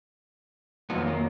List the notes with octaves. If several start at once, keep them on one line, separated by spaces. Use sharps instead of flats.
F2 D#3 F#3 A#3 B3
A#3